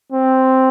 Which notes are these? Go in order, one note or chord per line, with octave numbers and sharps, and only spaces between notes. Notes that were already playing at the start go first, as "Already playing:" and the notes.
C4